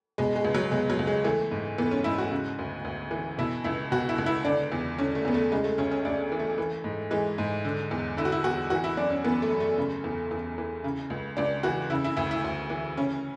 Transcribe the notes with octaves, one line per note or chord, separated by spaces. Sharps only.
B2 G#3
G#3
C#2
F#3
B2 G#3
F#3
C#2
G#3
E3 A3
G#2
E3 B3
C#4
G#2 E4
F#4
C#3
D2
D2
E3
B2 E4
C#2 E4
B2 F#4
E4
C#2
E4
D3 D4
E2
D3 C#4
A3
E2 B3
A3
C#3 G#3
A3
D2 C#4
C#4
D2 D4
E3
A3
E3
G#2
E3 G#3
G#2
D3
E2
D3 E4
F#4
E4
E2 F#4
E3 F#4
E4
F#2 D4
C#4
E3 B3
A3
F#2
A3
C#3
E2
E2
E3
C#3
C#2
C#2 D4
E3 F#4
C#3 E4
E4
D2 E4
E4
D2
E3
C#3 C#4